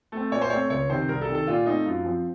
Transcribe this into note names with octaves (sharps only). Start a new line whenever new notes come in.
A3 C4
A#2 C#5
C5
A3 C4 C#5
C#2 C#5
C3 D#3 C5
C2 A#4
A4
C3 D#3
A4
A#2 F4
A3 C4 D#4
F#2 F4
F3 C4